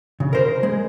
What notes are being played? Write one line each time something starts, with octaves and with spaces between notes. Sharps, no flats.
C#3
A#4 C5
G#3